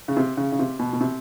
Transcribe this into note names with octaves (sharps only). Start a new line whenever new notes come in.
C#3
C3
C#3
C#3
C3
B2
B2
C3